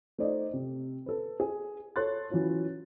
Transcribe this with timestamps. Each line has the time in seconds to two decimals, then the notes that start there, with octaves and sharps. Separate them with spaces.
0.18 A3 D#4 C5 D5 D#5
0.53 C3
1.06 A4 B4
1.40 G#4
1.96 A4 C#5 C6 F#6 A6
2.30 E3 F#3 C#4 F4 C#5